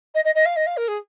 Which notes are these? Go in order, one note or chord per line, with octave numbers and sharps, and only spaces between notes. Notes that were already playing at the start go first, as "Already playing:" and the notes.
D#5
D#5
D#5
F5
D#5
F5
A#4
G#4